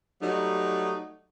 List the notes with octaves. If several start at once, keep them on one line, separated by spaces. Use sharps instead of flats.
F#3 G3 A3 D#4